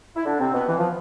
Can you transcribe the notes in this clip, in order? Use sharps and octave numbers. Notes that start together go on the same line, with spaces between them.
E4
D3 D4
C3 C4
B2 B3
E3
F3